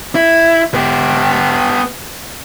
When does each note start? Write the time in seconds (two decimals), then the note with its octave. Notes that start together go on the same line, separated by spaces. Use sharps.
0.15 E4
0.74 B3 G4